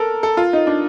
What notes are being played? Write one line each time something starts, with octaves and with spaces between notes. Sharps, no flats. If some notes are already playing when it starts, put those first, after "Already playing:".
Already playing: A4 A#4
A4
F4
D#4
D4